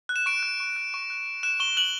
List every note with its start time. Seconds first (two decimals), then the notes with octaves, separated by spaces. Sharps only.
0.09 F#6
0.16 E7
0.26 C#6 D7
0.43 F#6
0.60 C#6
0.76 F#6
0.94 C#6
1.10 F#6
1.26 C#6
1.43 F#6 E7
1.60 C#6 G7
1.77 F#6 F#7